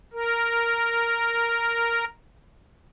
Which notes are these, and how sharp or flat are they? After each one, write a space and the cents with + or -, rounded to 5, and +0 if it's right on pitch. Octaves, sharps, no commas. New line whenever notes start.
A#4 -5